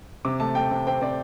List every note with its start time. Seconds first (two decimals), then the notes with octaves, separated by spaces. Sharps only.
0.25 C3 D6
0.40 A3 A5
0.55 A3 G5
0.71 C3
0.87 C4 G5
1.02 C4 D5